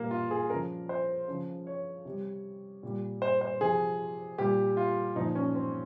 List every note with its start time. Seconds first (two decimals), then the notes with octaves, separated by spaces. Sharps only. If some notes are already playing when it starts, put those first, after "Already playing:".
Already playing: A#2 G3 A#3
0.11 F4
0.31 G#4
0.50 C#3 F3 A#4
0.89 C5
1.28 C#3 F3
1.67 C#5
2.05 C3 G3
2.83 A#2 G3
3.22 C5
3.41 C5
3.60 C3 F3 G#4
4.38 A#2 G3 G4
4.77 F4
5.16 A#2 F3 D#4
5.35 C#4
5.55 C4